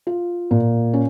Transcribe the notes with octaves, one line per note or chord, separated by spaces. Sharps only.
F4
A#2
C#4